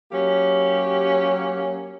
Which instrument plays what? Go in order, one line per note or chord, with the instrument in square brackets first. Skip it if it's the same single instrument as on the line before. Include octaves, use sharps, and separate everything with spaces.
[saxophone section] F#3 A#3 C#4 G4